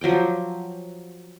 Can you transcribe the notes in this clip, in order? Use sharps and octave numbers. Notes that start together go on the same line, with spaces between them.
F3 F#3 D5 G5